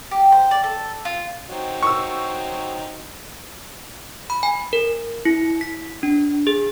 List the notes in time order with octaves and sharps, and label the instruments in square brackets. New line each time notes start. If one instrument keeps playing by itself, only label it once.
[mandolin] G4
C5
D5
A4
F4
[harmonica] F#3 C4 D#4
[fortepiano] C#6 E6
[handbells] B5
G#5
A#4
E4
B6
D4
G#4